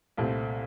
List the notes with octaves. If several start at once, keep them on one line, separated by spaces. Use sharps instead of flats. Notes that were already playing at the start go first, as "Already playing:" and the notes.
C2 A#2 A3 C4